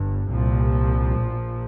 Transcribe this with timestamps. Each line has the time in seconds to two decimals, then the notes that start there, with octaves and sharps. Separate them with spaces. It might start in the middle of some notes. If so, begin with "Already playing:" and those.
Already playing: G1 G2
0.27 C2 A#2 F3
1.21 A#1 A#2